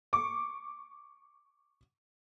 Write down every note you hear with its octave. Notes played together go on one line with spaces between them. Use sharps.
C#6 D6